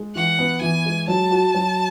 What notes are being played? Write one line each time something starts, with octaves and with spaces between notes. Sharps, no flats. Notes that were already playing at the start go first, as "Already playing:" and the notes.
Already playing: G#3
E3 F#5
B3
E3 G#5
G#3
F#3 A5
F#4
F#3